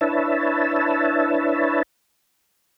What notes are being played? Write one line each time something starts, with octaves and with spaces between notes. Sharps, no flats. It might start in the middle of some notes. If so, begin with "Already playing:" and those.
D4 E4 B4 C#5 E5 A5